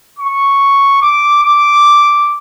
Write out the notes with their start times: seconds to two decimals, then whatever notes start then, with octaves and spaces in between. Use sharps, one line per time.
0.19 C#6
1.02 D6
1.43 D6